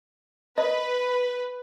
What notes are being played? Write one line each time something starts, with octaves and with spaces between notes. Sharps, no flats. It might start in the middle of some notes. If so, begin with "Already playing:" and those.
B4 D#5